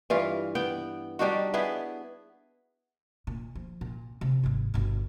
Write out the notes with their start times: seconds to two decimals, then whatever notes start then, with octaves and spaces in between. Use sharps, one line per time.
0.10 G2 E3 F4
0.55 B3 G5
1.19 G3 D4 D#4 F#4
1.54 B3 E4 G#4
3.27 A#2
3.55 F3
3.81 A#2
4.21 C3 C#4
4.43 G#1 G2
4.74 G1 B2